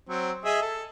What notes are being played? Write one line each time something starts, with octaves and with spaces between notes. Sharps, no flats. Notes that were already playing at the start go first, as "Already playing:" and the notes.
F#3 C4
G#4 D#5 E5
A4